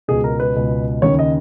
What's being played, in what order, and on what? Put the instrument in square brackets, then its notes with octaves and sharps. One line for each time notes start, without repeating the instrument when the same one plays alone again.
[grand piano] C#2 B2 G#4
A#4
B4
C#2 B2
D#2 C#3 C#5
D#5